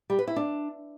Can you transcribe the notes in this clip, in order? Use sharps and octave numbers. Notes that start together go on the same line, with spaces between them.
G3
B4
E4
D4